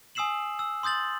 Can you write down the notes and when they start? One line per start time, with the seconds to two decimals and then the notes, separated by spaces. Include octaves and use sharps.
0.15 G#5 D#6 E6 C7 E7 F#7
0.59 E6
0.83 C6 D#6 G6 A6 F#7